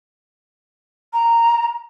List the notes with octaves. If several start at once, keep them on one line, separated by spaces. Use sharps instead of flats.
A#5